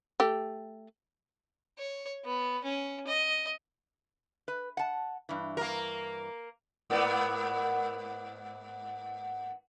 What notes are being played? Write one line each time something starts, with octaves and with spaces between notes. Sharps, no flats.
A3 G4
C#5
B3
C#4
D#5
B4
F#5 A5
G2 E3
A#3 A#4
G#2 A#3 B3